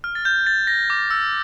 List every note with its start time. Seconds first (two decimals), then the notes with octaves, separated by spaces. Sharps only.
0.04 F6
0.15 A6
0.25 G6
0.47 A6
0.67 A#6
0.90 D6
1.10 E6